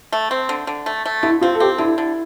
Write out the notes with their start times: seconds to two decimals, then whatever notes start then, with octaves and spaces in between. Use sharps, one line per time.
0.12 A3
0.31 C4
0.49 D3
0.67 D3
0.86 A3
1.06 A3
1.23 D3 E4
1.41 C4 F4
1.54 A4
1.60 C4 G4
1.78 D3 E4
1.98 D3